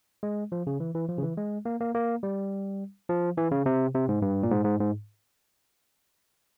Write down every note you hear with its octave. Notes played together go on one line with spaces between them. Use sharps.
G#3
F3
C#3
E3
E3
F3
C#3
E3
G#3
A#3
A#3
A#3
G3
F3
E3
C#3
C3
C3
G#2
G2
A#2
G#2
G#2
G#2